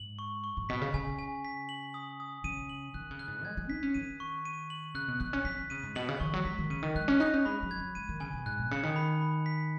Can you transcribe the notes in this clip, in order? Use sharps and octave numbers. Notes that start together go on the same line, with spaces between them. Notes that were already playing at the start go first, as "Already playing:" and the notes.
Already playing: G#2 F#7
C#6
C#6
G#2
B2 B6
C#3
C#3 G#5
G#5
B6
F#7
D#6
D#6
C#3 D#7
F#7
D#3 F#6
C#3
F#6
G#2
G#3 G#6
G#3
D#4 B6
C#4
D#3 D#7
C#6
D#7
F#7
C#3 F#6
B2
B3 F#6
C#4
C#4 B6
D#3
C#3 D#7
G#2
B2 F#7
C#3
D#3 C#6
F#3
G#3 B6
D#3
C#3 D#7
D#3
G#3 F#6
C#4
D#4 F#6
C#4
G#3 B5
F#3
G#6
F#3
G#3 D#7
D#3
C#3 G#5
B2
G#2 F#6
B2
C#3 C#7
D#3
B5
B5
B6